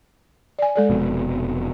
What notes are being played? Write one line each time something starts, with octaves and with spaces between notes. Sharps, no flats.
D5 G#5
G#3 A4 D5
F1 F2 B2